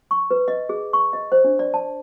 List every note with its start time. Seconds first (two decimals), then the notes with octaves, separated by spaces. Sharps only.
0.11 C#6
0.31 B4
0.48 D#5
0.69 G#4
0.93 C#6
1.13 D#5
1.32 C5
1.44 D4
1.59 D5
1.74 A5